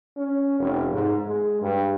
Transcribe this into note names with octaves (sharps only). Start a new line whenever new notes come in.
C#4
F1
G#2
G#3
G2